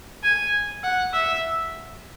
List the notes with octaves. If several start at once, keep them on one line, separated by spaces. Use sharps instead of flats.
G#5
F#5
E5